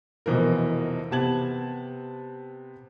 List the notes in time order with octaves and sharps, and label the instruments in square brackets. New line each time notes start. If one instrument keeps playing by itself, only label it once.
[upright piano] F1 B2 E3 F3 A#4
C3 B3 A5 G#6 F#7